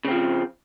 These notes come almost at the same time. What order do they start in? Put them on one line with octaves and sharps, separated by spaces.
C#3 C4 F3